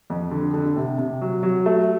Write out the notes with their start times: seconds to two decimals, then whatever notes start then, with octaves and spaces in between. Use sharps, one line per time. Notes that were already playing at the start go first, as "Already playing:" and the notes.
0.10 F2
0.31 D3
0.54 D3
0.76 C3
0.98 C3
1.21 F#3
1.43 F#3
1.66 A3